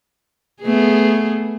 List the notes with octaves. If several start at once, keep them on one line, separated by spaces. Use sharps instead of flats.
A3 B3 G#4